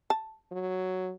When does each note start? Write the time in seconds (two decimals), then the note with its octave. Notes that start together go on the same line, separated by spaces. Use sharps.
0.10 A5
0.52 F#3